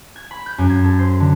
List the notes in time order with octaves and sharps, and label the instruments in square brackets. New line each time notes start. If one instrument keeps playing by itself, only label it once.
[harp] G#6
B5
G6
F#2
G#6
A4
C5
D3